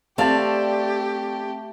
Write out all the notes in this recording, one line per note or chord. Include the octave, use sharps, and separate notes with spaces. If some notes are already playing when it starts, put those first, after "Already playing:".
A3 C4 G4 D5 F5 A5